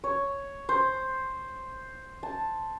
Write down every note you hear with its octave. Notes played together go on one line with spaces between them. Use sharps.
C#5
C5
A5